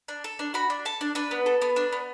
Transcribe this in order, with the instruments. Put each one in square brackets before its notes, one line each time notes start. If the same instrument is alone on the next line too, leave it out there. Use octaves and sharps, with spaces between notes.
[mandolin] D4
A4
D4
F#4 B5
D4
A4 A5
D4
D4 B4
B3
A4
B3
D4
B3